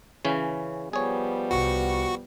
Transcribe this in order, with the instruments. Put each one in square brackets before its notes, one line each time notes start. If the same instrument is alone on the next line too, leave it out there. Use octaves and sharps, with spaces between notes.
[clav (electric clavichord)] C#3 E3 C#4
[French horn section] F3 G3 B3 [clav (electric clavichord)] G#4 C#5
[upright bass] C2 C3 [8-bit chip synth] F#4 C#6